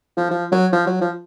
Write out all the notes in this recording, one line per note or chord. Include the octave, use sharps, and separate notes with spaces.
F3
F3
F#3
F3
F#3
F3